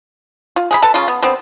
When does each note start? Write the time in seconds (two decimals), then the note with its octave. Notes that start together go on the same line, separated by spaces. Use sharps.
0.56 F4
0.71 G#4 F#5 B5
0.82 A4 B4 A5
0.94 C#3 C#4 F4
1.08 B3
1.22 D3 B3 C4